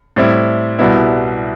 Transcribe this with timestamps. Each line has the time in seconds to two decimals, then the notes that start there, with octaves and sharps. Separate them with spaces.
0.16 A2 G3 C4 E4
0.79 C2 B2 G3 B3 E4